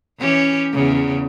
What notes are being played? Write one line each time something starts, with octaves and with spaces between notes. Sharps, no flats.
E3 C#4 G4
E2 C#3